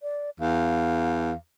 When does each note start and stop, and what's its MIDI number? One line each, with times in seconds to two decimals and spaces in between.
0.03 0.30 74
0.40 1.33 40
0.40 1.35 77